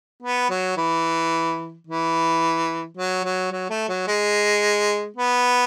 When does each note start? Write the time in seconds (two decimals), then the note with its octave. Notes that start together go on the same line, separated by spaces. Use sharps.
0.23 B3
0.50 F#3
0.77 E3
1.87 E3
2.97 F#3
3.24 F#3
3.52 F#3
3.70 A3
3.89 F#3
4.07 G#3
5.16 B3